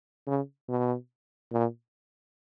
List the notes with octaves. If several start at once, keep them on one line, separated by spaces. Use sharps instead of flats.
C#3
B2
A#2